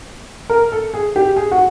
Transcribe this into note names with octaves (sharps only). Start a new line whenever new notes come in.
A#4
A4
G#4
G4
G#4
F#4